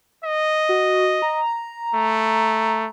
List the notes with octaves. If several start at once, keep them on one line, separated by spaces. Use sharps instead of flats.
D#5
F#4
A#5
A3